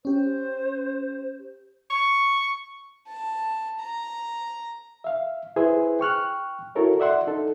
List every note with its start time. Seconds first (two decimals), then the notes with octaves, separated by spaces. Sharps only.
0.05 C#4 G4 C5
1.90 C#6
3.08 A5
3.79 A#5
5.04 E5 F5
5.56 E4 G#4 B4 C5 E5
6.00 G5 C#6 F6 F#6
6.75 E4 F#4 A4 A#4 C#5
7.00 D5 E5 F#5 C6
7.27 D#4 A4